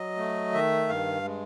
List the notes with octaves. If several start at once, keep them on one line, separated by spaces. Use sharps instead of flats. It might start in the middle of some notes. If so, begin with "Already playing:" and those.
Already playing: F#3 D#5
A3
D#3 E5
G2 F5
G#3